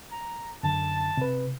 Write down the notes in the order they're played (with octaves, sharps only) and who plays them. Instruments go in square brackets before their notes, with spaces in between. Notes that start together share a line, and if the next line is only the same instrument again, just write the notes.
[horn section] A#5
[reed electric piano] F#2 D3 [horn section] A5
[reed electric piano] C3 B4